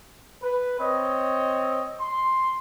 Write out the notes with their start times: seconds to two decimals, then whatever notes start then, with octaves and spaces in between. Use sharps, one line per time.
0.43 B4
0.80 C4 C#5 D#5
2.01 C6